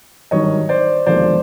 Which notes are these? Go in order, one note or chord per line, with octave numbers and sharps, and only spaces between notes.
G#1 G2 D#3 F#3 C#5 D#5
C5 D5
E1 D#2 D3 F3 C5 D5